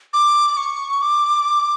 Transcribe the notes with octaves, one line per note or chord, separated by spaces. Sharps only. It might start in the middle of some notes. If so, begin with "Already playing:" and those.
D6
C#6
D6